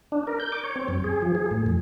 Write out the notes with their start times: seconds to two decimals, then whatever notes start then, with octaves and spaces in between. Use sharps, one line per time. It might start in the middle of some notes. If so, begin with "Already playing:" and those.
0.12 D4
0.27 A#4
0.40 G6
0.52 D6
0.64 C#5
0.76 C4
0.88 F#2
1.04 G#4
1.22 F3
1.35 G#4
1.51 A2
1.66 F2